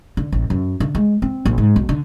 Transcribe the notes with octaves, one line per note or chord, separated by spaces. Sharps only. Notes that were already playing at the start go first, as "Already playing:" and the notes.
D3
A1
F#2
D3
G#3
C4
A#1
G#2
B1
D3